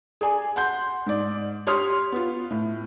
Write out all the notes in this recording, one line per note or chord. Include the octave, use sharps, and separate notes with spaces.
G#4 D5 G#5
F#5 C6 G6
G#2 D5
G4 C#5 C6 D#6 F6
B3 F4
A2